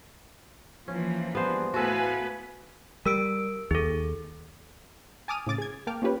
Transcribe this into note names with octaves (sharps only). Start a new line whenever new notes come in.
E3 F3 A#3 C#4
G3 B3 D4 G#4 C5
A2 A3 B3 F#4 A4 B4 F5 G#5
G3 A#4 E6 D7
D#2 G#4 A4
G#5 A5 D6 D#6 F6 D#7
A2 C#3 D6 A6
G#4 G#6
A#3 G5 A5 D6 F6
A#3 C#4 F4 G4 B4 C#5